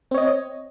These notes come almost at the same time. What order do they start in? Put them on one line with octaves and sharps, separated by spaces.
C4 C#5 D#5